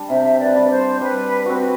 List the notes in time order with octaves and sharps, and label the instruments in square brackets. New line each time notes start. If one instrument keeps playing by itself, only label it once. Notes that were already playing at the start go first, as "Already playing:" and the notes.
Already playing: [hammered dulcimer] G3 D4
[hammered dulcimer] C3 [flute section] C5 E5
[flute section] B4 D5
[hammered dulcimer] G3 D4
[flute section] C5
[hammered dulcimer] G3 [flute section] B4
[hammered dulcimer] C4 F#4 [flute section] B4